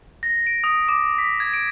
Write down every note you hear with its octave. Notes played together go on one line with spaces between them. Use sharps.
A#6
D7
D#6
D6
B6
G#6
D7